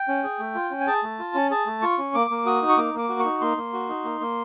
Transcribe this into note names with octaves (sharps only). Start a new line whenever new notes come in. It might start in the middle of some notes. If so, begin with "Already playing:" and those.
Already playing: G5
C#4
G#4
A3
F4
C#4
G#5
G#4 A5
A3
F4
C#4
G#4 A5
A3
F4 C#6
C#4
A#3 D6
A#3
F#4 D#6
D#4
C#6
A#3 D6
A#3 D6
F#4
C#6
D#4
A#3 C6
A#3
F#4
D#4
A#3
A#3